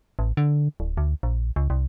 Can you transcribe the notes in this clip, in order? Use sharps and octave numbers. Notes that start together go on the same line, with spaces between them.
A1
D3
D1
D2
A#1
C#2
C2